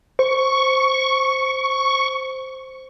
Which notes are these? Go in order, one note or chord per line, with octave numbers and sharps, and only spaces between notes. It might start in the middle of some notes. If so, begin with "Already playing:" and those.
C5 C#6